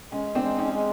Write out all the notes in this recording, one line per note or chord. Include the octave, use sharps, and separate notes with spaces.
G#3 C#4
C4 D4
G#3
C#4 D#4
G#3